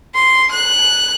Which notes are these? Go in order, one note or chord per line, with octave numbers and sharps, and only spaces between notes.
C6
F#6